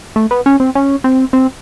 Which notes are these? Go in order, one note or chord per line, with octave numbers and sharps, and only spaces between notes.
A3
B3
C#4
C4
C#4
C4
C4